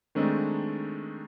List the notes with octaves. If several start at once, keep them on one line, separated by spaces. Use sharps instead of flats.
D#3 G#3 A3 C4 D4 D#4